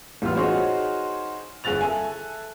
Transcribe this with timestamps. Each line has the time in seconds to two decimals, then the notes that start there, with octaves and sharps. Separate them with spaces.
0.22 A1 G3 B3 F4 F6
0.35 D#4 F#4 G#4 C5 C#5 C6
1.64 G1 G#4 F#6 A6 F7
1.81 A4 E5 G#5